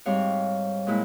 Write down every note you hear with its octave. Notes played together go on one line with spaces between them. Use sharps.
G#2 G3 C4 C#5 F5
A#2 G#3 E4